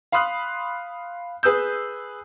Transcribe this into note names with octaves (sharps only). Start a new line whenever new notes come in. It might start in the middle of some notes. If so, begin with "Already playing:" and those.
F5 B5 C6 D#6 F#6
G#4 B4 D#6 E6 G6